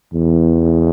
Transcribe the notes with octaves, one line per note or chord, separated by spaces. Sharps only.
E2